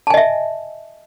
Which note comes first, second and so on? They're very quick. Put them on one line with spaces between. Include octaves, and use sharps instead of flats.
A5 G#5 D#5 E5